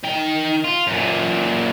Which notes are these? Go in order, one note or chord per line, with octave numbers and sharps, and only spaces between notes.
D#3 G5
F4
F#2 A#2